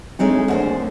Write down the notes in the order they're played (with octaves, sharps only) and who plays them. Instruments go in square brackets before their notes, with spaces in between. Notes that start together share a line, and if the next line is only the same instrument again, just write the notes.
[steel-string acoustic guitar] G#3 A3 D#4 [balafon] C4 D4 C#5
[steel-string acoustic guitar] D#2 D3 C5 [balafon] A3 F#5 G#5